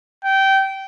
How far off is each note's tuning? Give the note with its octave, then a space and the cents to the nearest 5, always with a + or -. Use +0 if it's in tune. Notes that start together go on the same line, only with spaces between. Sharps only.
G5 -20